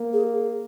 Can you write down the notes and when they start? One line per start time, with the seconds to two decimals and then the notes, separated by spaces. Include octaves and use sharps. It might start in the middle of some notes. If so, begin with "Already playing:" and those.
Already playing: A#3
0.13 G#4